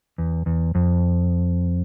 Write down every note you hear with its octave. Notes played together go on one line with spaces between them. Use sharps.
E2
E2
F2